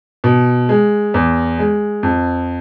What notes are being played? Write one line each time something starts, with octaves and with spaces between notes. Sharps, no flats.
B2
G#3
E2
G#3
F2